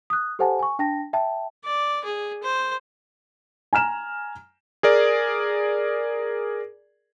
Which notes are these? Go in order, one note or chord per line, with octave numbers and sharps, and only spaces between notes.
D#6 F#6
G4 A4 C5 F#5 G#5 A5
G#5 C#6
D4 G5 A5 A#6
E5 G5 A5
D5
G#4
C5
G#5 A#5 F6 E7
G#4 A#4 D5